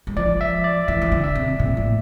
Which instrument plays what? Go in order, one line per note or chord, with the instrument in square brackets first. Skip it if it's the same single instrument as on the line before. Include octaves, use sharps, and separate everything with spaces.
[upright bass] G3
[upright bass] F3 [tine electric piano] D5
[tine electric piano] E5
D5
[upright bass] E3 [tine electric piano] E5
[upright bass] E3
D3
[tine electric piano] E5
[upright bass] C3
A#2
A2